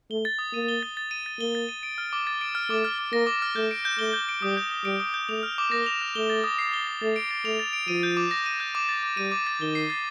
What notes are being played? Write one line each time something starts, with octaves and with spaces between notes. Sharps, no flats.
A3 G7
A6
D#6
A#3 D#7
G7
A6
A6
D#7
A6
A#3 G7
A6
D#7
D7
F6
D6
A6
D7
F6
A3 D6
F6
D6
A#3 A#6
D6
F6
A3 G6
D7
G6
A3 G7
G6
D7
G3 D#6
G6
D#6
G3 D7
D#6
G6
A3 F7
F6
D6
A#3 A#6
F7
F6
A3 G7
A6
D#6
C7
G7
A6
A3 A6
D7
A6
A3 F7
A6
D7
F3 D#7
G6
D6
A#6
D#7
G6
D6
A6
D6
G3 D#7
D6
A6
D#3 G7
C7
A6